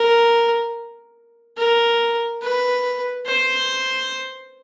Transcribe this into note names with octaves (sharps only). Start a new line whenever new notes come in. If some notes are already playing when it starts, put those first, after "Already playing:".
Already playing: A#4
A#4
B4
C5